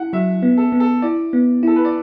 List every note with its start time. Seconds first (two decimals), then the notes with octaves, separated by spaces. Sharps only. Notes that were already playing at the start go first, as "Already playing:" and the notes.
Already playing: E4 F#5
0.13 F#3 E5
0.43 B3
0.57 A4
0.72 B3
0.80 A4
1.02 E4 D5
1.33 B3
1.63 E4 A4
1.76 B4
1.85 D5